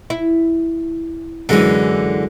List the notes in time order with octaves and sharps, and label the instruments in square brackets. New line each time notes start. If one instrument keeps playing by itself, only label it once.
[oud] E4
[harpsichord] F#2 G#3 [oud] D3 E3